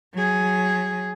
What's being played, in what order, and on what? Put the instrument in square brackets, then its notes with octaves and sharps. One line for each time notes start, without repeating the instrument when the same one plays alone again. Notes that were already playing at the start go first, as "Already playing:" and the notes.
[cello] F#3 G#4